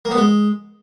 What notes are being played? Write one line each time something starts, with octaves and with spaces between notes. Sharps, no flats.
A#3
B3
G#3